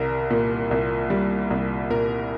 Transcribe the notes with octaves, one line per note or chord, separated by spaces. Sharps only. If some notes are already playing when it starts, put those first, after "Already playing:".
Already playing: C2 G3 A#4
A#2
C2
G3
C2
A#2 A#4